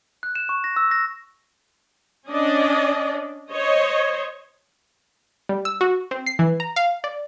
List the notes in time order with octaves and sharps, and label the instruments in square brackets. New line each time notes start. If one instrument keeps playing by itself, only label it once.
[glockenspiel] F#6
E7
C#6
A#6
E6
A#6
[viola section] C#4 D4 D5 D#5
C5 C#5 D#5
[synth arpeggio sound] G3
E6
F#4
C4
C7
E3
A#5
F5
D5